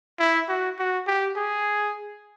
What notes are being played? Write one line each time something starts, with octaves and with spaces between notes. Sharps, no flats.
E4
F#4
F#4
G4
G#4